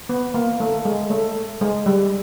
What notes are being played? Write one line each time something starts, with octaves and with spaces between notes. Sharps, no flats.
B3
A#3
A3
G#3
A3
G#3
G3